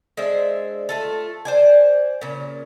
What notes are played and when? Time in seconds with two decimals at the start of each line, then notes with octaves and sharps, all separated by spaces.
0.17 G#3 D4 C5 E5
0.89 A3 F4 A4
1.45 C5 D5 G#5
2.21 A#2 C#3